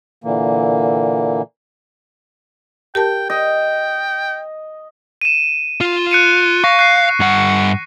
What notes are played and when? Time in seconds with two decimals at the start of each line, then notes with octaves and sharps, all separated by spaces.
0.24 A#2 D3 E3 A#3
2.95 G4 A#4 G5 A5
3.30 D#5 G5
5.21 D#7 E7
5.81 F4
6.11 F#6 C#7 D#7
6.64 F5 C#6 A#6
6.79 F#6 C7
7.20 G2 F#5